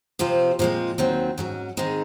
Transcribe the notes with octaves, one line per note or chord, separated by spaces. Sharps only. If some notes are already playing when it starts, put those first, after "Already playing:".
C3 F3 C4 F4
A#2 F3 G#3 C4
D#2 D#3 F#3 C4
G#2 F#3 C#4
G#2 D#3 G#3 C4 D#4